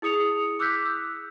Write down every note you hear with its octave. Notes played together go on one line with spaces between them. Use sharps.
E4 G#4 D#6 C#7 F7
D6 E6 F#6 G6 B6
E6